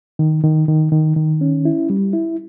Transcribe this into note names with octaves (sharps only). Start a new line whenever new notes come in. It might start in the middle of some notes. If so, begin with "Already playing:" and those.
D#3
D#3
D#3
D#3
D#3
C#4
E4
G3
E4